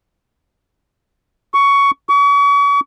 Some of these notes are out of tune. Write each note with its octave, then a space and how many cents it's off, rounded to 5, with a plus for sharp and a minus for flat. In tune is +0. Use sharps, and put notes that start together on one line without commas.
C#6 +15
C#6 +40